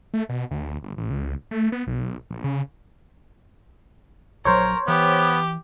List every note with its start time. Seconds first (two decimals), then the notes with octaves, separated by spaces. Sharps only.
0.14 A3
0.29 B2
0.51 D2
0.83 G1
0.97 A1
1.10 C#2
1.51 A3
1.72 B3
1.87 B1
2.31 A#1
2.44 C#3
4.45 A#1 F#3 A#4 C5 C#5
4.88 E3 B3 G4